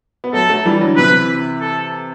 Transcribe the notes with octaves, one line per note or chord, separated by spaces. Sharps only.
B3
F#3 A3 A4
F#3 A3
E3 G3
D3 F#3
C3 E3 B4
A4